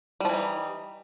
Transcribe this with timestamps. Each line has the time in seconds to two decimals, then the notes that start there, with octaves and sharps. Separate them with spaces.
0.20 G3
0.25 F3
0.29 E3
0.33 D#4